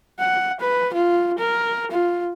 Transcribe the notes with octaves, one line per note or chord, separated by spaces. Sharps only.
F#5
B4
F4
A#4
F4